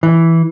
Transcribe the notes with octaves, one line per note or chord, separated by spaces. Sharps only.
E3